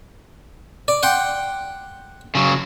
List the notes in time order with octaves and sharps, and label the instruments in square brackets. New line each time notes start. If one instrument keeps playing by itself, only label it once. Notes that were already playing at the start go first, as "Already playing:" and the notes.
[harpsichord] D5
F#5 G5 C6
[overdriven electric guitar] C#3 F#3